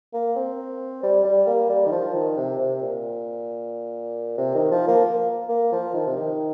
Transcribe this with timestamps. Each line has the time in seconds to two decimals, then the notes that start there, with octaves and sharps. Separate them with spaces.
0.13 A#3
0.36 C4
1.03 G3
1.25 G3
1.47 A#3
1.69 G3
1.86 D#3
1.92 F3
2.14 D#3
2.37 C3
2.59 C3
2.82 A#2
4.38 C3
4.55 D#3
4.71 F3
4.88 A#3
5.05 A#3
5.49 A#3
5.72 F3
5.94 D#3
6.06 C3
6.16 D#3